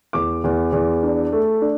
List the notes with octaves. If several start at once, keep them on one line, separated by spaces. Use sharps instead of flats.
E2 D6
E2
E2
D4
A3
D4